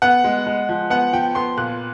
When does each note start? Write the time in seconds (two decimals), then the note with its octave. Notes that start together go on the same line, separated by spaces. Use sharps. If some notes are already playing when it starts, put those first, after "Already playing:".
0.02 B3 F#5
0.24 G#3
0.47 G#3
0.69 F3
0.90 B3 F#5
1.13 F3 G5
1.35 B3 C6
1.57 A#2 F#6